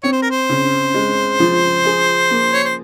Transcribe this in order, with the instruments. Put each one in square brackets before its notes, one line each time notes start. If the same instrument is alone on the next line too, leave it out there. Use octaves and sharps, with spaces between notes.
[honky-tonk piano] C4 [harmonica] C#5
[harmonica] C5
A#4
C5
[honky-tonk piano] C#3
G#3
F3
G#4
A#3
[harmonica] C#5
C5